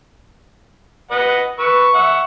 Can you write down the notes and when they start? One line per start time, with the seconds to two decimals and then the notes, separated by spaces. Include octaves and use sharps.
1.11 B4 D#5 F#5
1.59 B4 C#6 E6
1.94 E5 F#5